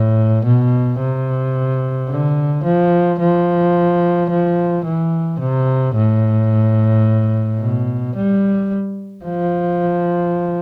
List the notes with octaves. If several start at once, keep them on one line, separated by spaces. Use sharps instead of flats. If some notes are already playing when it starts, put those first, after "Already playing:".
Already playing: A2
B2
C3
D3
F3
F3
F3
E3
C3
A2
B2
G3
F3